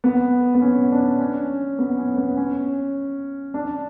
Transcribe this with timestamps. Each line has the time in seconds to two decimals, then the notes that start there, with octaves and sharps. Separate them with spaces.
0.04 B3
0.55 B3
0.62 C#4
0.92 D4
1.20 C#4
1.79 B3
1.98 C#4
2.17 B3
2.37 C#4
3.54 D4